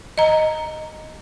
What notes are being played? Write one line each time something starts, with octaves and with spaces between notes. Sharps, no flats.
D#5 A#5